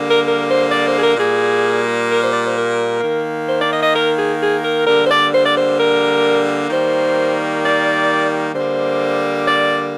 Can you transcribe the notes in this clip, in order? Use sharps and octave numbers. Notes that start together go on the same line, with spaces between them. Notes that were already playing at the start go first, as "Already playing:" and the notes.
Already playing: D3 G3 A#3
A#4
A#4
C5
D5
C5
G#4
A#4
A#2 G3 A#3 G#4
A#4
C5
D5
C5
A#4
D#3 A#3
C5
D5
D#5
D#5
A#4
G#4
G#4
A#4
D3 G3 A#3 A#4
C5
D5
C5
D5
C5
A#4
D#3 G3 A#3 C5
D5
D3 G3 A#3 C5
D5